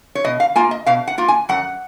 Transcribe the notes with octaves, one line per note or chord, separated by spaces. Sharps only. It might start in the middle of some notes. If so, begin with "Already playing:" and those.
C#5
B2 D#5
F5
A#3 F4 G#5
D#5
B2 F5
F#5
A#3 F4
G#5
F#2 F#5